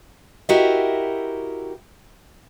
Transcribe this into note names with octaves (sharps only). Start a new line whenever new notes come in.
E4 F#4 G4 A#4 D#5 E5